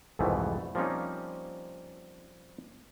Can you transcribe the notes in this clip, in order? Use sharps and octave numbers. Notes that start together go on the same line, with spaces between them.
C2 F2 G#2 B2 E3 A3
F3 G3 A#3 C4 C#4 D#4